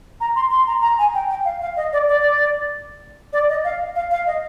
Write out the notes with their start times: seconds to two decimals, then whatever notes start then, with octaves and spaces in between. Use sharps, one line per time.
0.21 A#5
0.36 C6
0.51 C6
0.67 A#5
0.82 A#5
0.99 G#5
1.14 G5
1.30 G5
1.45 F5
1.62 F5
1.77 D#5
1.93 D5
2.08 D5
3.33 D5
3.49 D#5
3.64 F5
3.95 F5
4.11 F5
4.27 D#5